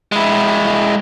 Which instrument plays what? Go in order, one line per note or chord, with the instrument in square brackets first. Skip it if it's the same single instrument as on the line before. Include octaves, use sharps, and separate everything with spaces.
[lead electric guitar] G#3 E4